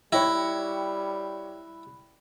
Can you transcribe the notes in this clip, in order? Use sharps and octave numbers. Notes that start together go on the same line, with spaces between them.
G3 E4 C#5 G5 B5 F#6 A#6